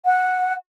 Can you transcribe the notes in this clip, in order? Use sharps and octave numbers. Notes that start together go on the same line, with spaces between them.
F#5